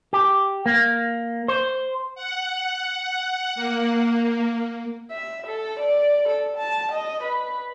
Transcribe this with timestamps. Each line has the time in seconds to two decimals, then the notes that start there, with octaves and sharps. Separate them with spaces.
0.13 G4
0.66 A#3
1.48 C5
2.15 F#5
3.55 A#3
5.11 E5
5.47 A4
5.80 D5
6.28 A4
6.57 A5
6.92 D#5
7.23 B4